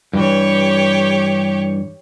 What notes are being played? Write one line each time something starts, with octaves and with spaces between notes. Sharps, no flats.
G2 E3 G4 C#5